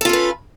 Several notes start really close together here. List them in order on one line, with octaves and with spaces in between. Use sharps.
A4 F4 C#4 B4